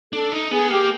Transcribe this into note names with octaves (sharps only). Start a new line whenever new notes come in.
D4 A4 A5
D#4
B3 G#4 G#5
A#3 G4 G5